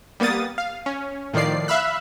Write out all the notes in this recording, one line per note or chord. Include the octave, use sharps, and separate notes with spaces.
G3 A#3 B3 D#6 A6
F5
C#4
A2 D#3 F3 D5 C7
E5 F5 B5 E6 F#6